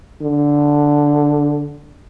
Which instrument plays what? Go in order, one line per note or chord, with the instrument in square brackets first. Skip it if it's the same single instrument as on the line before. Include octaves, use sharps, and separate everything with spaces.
[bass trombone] D3